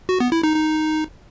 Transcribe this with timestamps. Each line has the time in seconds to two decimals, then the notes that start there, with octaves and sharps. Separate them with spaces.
0.09 F#4
0.20 B3
0.32 E4
0.43 D#4
0.55 D#4